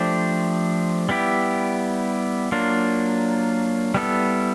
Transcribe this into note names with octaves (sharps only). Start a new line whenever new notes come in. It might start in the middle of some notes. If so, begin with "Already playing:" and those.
Already playing: F3 A3 D4 G4 C5
G3 B3 E4 G4
F#3 A#3 D4 F4
G3 B3 E4 A4